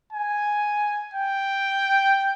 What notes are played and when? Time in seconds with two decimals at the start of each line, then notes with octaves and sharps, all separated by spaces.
0.13 G#5
1.14 G5